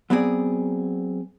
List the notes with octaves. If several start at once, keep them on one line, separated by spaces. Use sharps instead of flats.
F#3 B3 C4 G#4 D5